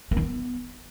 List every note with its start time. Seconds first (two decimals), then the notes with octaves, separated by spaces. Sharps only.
0.11 A#3
0.17 D#3
0.22 B3